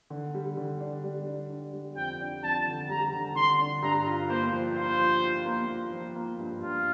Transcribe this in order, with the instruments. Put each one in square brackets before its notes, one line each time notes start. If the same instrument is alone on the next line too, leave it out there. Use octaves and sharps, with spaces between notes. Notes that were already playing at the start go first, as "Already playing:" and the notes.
[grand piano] D3
G3
D3
D4
G3
D4
D4
G3
[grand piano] F2 [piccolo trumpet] G5
[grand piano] D4
[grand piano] F2 [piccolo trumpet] A5
[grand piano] D3
[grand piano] G3 [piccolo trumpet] A#5
[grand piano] D3
[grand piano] D3 [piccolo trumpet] C6
[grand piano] D4
[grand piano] G2 [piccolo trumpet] A#5
[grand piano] F4
[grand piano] A#3 [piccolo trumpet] C5
[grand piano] F3
[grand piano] F4 [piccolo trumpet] C5
[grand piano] F3
F4
A#3
F4
F3
A#3
G2
[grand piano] G2 [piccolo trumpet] F4